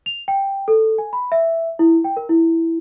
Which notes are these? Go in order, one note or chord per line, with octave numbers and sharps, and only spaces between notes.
F7
G5
A4
G#5
B5
E5
E4
G5
A#4
E4